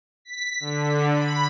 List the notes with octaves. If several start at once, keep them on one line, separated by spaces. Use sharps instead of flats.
B6
D3
B5